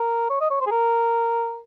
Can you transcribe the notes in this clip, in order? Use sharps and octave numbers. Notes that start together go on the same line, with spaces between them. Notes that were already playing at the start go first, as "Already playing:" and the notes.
Already playing: A#4
C#5
D#5
C#5
C5
G#4
A#4